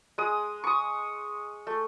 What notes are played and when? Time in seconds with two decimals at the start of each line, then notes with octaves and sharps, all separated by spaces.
0.18 G#3 D#6
0.64 C#6 D#6
1.67 A3